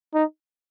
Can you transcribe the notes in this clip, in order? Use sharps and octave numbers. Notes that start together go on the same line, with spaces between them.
D#4